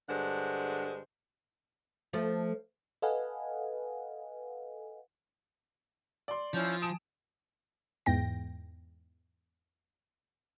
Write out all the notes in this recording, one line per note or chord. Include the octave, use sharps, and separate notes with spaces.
G2 D3 G#3 C5 F#5
F3 A3
A4 B4 D#5 F5 F#5 G#5
D5 C6
F3 C#4 E4 G6
G#5 A5 D#6 D7 E7
E2 G#2 G5 A#6